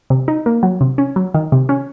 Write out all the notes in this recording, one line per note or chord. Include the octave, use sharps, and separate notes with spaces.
C3
D#4
A#3
F#3
C3
C#4
F#3
D#3
C3
C#4